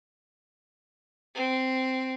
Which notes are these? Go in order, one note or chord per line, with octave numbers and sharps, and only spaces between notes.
C4